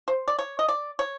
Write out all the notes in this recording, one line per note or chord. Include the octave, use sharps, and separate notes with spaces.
C5
D5
C#5
D#5
D5
C#5